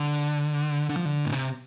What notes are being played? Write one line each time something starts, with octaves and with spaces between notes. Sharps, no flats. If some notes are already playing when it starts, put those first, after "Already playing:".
Already playing: D3
D3
F3
D3
A2
C3